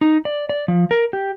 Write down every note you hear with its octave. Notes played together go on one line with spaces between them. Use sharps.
D#4
D5
D5
F3
A#4
G4